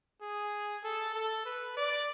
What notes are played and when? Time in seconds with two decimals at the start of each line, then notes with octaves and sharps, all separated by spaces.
0.22 G#4
0.84 A4
1.15 A4
1.45 B4
1.77 D5